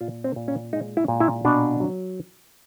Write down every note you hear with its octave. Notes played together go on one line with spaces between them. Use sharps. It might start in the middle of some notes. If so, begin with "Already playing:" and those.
A#2 F4
C4
A#2
C#4
G#3 D#4
E4
A#2
E4
B2 D4
F#3